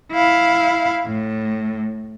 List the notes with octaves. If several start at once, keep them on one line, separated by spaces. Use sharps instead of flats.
E4 F5
A2